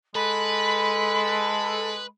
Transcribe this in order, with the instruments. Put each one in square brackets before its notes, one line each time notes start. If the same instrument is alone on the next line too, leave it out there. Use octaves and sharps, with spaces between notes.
[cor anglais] G#3 [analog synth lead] A4 [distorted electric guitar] B4 [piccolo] B5